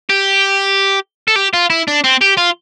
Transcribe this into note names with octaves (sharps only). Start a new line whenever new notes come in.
G4
A4
G4
F4
E4
D4
C4
G4
F4